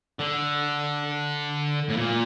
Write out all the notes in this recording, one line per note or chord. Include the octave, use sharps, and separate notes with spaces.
D3
A2
A#2